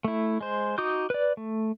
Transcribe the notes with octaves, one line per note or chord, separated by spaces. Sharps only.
A3 E4
G#3 C5
D#4 F#4 D6 D#6 G6
B4 D5
A3